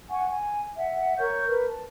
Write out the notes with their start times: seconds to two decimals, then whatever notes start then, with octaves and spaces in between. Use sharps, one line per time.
0.10 F#5 G#5 C#6
0.29 G#5
0.77 E5 F#5
1.19 A#4 C#5 C#6 G6
1.48 A#4 B4
1.67 A5